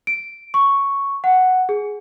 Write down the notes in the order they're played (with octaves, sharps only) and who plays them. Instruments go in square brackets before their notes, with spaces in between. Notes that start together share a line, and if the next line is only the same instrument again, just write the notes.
[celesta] D7
C#6
F#5
G#4